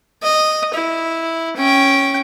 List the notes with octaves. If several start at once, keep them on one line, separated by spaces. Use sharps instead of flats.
D#5
E4
C#4 G5